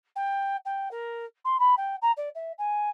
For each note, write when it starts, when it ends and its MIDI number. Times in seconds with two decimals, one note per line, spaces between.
0.16 0.56 79
0.65 0.89 79
0.91 1.25 70
1.45 1.59 84
1.59 1.75 83
1.77 1.96 79
2.02 2.12 82
2.17 2.29 74
2.35 2.52 76
2.58 2.89 80